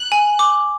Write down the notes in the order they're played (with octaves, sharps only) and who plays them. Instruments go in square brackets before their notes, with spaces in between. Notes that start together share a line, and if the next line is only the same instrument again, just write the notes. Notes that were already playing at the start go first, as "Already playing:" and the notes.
Already playing: [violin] F#6
[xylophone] G#5
D6